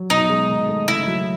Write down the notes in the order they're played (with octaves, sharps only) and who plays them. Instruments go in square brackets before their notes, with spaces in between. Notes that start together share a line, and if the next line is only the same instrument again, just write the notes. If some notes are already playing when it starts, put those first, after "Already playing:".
Already playing: [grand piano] F#3
[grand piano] B2 [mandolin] D#4
[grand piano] G#3
D#3
A3
[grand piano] C#3 [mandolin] E4
[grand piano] F#3